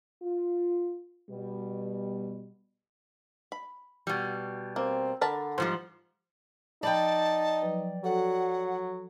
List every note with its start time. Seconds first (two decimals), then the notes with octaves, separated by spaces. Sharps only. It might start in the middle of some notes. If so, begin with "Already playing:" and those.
0.22 F4
1.30 B2 G3
3.52 B5
4.07 B2 G3
4.76 A#3 C4
5.21 D3 A#4 A5 B5
5.58 G#2 F3 G3 C5
6.83 F3 D#4 D5 G5 A5 B5 G6
7.62 F3 F#3 B4
8.04 F#3 F#4 A4 F#5